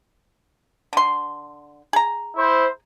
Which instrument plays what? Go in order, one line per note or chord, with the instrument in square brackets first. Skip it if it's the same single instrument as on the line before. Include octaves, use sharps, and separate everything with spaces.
[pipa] D3 C6
G#4 A#5
[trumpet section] E4 C5